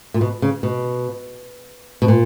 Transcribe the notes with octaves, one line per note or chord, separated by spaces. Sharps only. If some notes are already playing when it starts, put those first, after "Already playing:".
A#2
B2
C#3
B2
B2
A#2